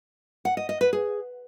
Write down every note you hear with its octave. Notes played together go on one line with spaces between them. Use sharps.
F#5
D#5
D#5
B4
G#4